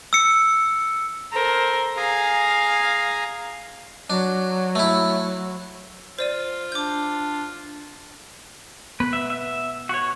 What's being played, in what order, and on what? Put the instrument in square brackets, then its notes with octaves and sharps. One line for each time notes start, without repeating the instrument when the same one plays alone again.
[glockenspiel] E6 C#7
[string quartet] A4 A#4 C5
[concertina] G#4 G#5 A#5 [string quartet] F5
[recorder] F#3 [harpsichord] D4
[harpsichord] A3 E4
[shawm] F4 [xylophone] C5 D5 D#7
[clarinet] D4 [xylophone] D6 G6
[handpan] B3 [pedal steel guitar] B4
[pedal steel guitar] E5
E5
F#4 C#5